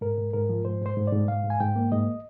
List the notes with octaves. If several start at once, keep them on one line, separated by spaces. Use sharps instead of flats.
G#2 A#4
G#2
G#2 A#4
F3
G#2 C5
G#2 C5
G#2
D5
G#2
G#2 F5
G#2
G#5
G#2 G5
A#3
G#2 D#5